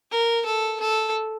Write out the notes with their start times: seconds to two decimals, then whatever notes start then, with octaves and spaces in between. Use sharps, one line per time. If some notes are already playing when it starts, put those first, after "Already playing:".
0.11 A#4
0.46 A4
0.80 A4